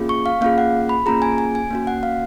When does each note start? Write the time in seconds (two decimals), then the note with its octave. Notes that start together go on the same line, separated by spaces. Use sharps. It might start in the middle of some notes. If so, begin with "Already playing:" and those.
Already playing: A#3 C#4 F4 G#4
0.09 C#6
0.26 F5
0.41 A#3 C#4 F4 G#4 F5
0.58 F#5
0.89 B5
1.06 A#3 C#4 F4 G#4 A#5
1.22 G#5
1.38 G#5
1.55 G#5
1.71 A#3 C#4 F#4
1.87 F#5
2.03 F5